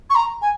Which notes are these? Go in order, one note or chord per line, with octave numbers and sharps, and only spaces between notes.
C#6
A#5
G#5